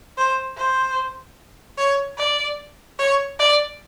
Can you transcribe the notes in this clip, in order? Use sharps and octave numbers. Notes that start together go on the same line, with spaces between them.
C5
C5
C#5
D5
C#5
D5